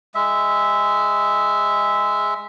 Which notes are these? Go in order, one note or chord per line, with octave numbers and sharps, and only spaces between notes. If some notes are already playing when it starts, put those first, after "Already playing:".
G#3 E5